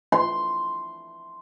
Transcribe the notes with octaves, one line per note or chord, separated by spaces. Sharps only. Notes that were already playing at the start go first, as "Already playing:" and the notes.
C6